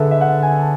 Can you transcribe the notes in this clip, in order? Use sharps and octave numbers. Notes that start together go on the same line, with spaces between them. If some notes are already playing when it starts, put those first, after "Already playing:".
Already playing: D3 G#4 A4 B4 E5
E5
F#5
G#5
A5